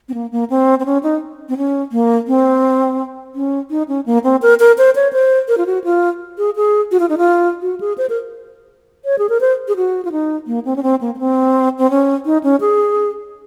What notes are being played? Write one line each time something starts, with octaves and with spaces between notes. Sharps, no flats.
C4
A#3
A#3
C4
C4
C#4
D#4
C4
C#4
A#3
C4
C#4
D#4
C#4
A#3
C4
A#4
A#4
C5
C#5
C5
A#4
F4
F#4
F4
G#4
G#4
F#4
F4
D#4
F4
F#4
G#4
C5
A#4
C#5
G#4
A#4
C5
G#4
F#4
F4
D#4
A#3
C4
C#4
C4
A#3
A#3
C4
C4
C#4
D#4
C#4
G#4